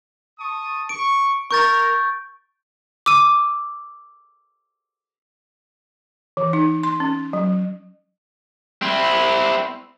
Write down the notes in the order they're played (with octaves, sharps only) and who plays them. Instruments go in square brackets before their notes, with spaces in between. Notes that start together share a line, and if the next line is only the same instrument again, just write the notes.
[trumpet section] A5 C#6 D#6
[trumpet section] C#6 [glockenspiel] D7
[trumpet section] A#4 [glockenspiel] C#6 G6 A6
[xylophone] D6 E6 D#7
[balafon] E3
D#4
C6
C#4
F#3
[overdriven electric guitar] C4 E4